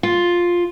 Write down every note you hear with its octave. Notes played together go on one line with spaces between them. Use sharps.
F4